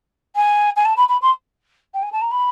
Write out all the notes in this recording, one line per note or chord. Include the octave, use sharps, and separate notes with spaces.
G#5
G#5
A5
B5
B5
C6
G5
G#5
A5
A#5
B5